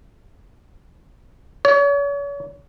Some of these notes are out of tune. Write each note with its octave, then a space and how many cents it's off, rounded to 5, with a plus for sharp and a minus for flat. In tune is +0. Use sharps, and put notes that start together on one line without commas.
C#5 +40